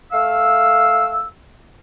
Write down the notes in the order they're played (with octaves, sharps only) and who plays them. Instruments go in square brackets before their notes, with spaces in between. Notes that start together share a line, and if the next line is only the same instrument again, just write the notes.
[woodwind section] A3 F5 E6